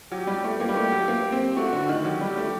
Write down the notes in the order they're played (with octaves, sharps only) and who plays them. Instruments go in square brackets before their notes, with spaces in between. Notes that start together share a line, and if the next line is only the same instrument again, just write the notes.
[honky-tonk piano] F#3 [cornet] G4
[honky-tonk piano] G3
A3
[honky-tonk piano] A#3 [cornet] G4
[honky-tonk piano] G3
A3
F#3
A#3
C4
[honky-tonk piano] A3 [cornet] F#4
[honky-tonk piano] D3
D#3
[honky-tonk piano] F#3 [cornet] G4
[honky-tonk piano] G3
A3